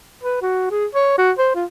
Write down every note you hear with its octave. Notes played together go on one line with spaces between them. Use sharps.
B4
F#4
G#4
C#5
F#4
C5
F4